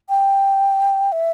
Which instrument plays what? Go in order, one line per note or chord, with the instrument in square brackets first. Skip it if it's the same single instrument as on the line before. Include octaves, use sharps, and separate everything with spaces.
[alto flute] G5
E5